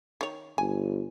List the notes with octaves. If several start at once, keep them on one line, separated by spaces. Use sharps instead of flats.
D#3 C#5
G1 G#5